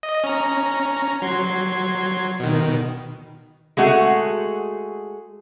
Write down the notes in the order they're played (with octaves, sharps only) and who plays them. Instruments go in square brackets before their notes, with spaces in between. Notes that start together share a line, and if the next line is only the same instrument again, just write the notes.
[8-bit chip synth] D#5
C#4 A#5
F#3 C6 G#6
B2 D#3
[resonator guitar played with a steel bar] G#3 A3 F#4 G#4